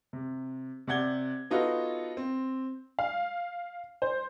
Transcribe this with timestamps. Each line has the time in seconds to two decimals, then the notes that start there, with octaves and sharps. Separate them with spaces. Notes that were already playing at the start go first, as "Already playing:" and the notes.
0.13 C3
0.87 C3 D5 F#5 G#6 G7
1.51 B3 D#4 F4 F#4 A4 B4
2.17 C4
2.99 F5
4.02 C5